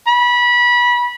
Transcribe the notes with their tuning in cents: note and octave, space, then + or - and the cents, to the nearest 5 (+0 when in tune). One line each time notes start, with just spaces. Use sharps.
B5 -25